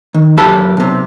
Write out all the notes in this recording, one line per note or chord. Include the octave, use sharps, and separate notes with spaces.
D#3
F#2 G4 A4 A5 B5
B1 C3